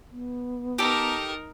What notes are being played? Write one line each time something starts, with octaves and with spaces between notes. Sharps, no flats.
B3
D#4 G4 A4 A#4